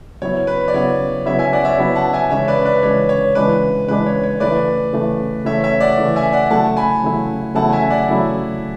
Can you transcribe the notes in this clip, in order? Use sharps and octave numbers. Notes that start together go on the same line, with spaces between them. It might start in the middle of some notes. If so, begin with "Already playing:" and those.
C#3 F#3 B3 E4 C#5
B4
D5
C#3 F#3 B3 E4 C#5
C#3 F#3 B3 E4 C#5 E5
E5 G#5
D5 F#5
C#5 E5
C#3 F#3 B3 E4 C#5
F#5 A5
E5 G#5
C#3 E3 G#3 D4 C#5 E5
B4 D5
B4 D5
C#3 E3 G#3 D4 C#5
C#5
C#3 E3 G#3 D4 B4
C#3 E3 G#3 D4 B4
C#5
C#5
C#3 E3 A3 B4 D5
C#3 E3 A3
C#3 E3 A3 C#5 E5
C#5 E5
D5 F#5
C#3 E3 A3
E5 G#5
D5 F#5
E2 C#3 F#3 A3 E4 F#5 A5
G#5 B5
E2 C#3 F#3 A3 E4
E2 C#3 F#3 A3 E4 F#5 A5
E5 G#5
D5 F#5
E2 C#3 F#3 A3 E4